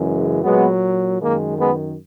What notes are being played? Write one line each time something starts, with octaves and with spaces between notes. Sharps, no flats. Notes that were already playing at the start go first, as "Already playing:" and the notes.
Already playing: F#2 C#3 E3 G#3
A#2 F#3 G#3 B3
F#2 D#3 G#3 A#3
G#3 B3